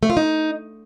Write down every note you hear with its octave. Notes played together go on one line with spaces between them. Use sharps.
A3
F4
D#4